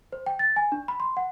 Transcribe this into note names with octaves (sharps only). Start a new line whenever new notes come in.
C5
G5
A6
G#5
D4
B5
C6
F#5